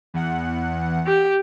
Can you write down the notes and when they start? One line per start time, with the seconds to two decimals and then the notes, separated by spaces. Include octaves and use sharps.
0.14 E2 F#5
1.06 G4